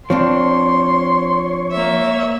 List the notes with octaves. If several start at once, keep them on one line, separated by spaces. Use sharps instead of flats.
F3 C4 D4 C#5 C6
A#3 E5